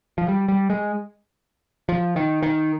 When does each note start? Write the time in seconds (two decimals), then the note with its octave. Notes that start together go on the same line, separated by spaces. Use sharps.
0.18 F3
0.28 G3
0.48 G3
0.70 G#3
1.89 F3
2.16 D#3
2.43 D#3